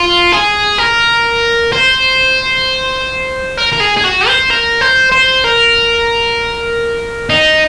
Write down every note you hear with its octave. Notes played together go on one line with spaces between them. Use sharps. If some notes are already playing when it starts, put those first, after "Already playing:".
Already playing: F4
G#4
A#4
C5
A#4
A#4
G#4
G#4
F#4
C5
A#4
C5
C5
A#4
D#4